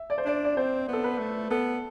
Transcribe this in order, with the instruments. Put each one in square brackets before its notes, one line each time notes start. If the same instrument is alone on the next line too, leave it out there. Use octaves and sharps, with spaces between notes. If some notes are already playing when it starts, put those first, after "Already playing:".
Already playing: [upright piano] E5
D5
C5
[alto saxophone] D4 [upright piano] D5
[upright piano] D5
[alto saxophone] C4 [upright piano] C5
[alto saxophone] B3 [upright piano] A4
[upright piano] B4
[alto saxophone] A3
[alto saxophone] B3 [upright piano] A4